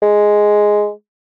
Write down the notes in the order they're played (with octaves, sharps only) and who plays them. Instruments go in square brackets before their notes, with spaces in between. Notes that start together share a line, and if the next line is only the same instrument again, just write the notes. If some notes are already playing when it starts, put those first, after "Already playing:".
[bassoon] G#3